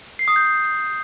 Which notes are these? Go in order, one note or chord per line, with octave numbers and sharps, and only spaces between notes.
C7
D#6
G6